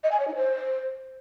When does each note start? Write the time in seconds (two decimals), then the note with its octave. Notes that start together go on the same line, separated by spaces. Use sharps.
0.04 D#5
0.12 G#5
0.20 C#5
0.28 D#4
0.36 C5